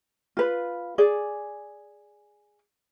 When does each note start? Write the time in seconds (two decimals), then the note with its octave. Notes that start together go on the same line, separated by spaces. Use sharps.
0.37 F4 B4
0.98 G#4 D5